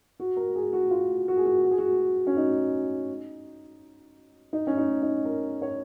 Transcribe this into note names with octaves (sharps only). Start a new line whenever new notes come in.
F#4
A#4
G#4
F#4
F4
F#4
G#4
F#4
F#4
G#4
F#4
C#4
D#4
D#4
C#4
D#4
D#4
A#4
C#5